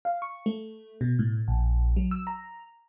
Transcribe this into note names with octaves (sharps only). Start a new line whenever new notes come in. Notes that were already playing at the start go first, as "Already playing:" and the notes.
F5
C#6
A3
B2
A2
A#1
F#3
E6
A#5